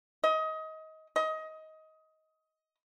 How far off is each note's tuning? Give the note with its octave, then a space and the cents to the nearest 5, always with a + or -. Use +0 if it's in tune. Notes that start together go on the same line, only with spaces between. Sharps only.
D#5 +25
D#5 +20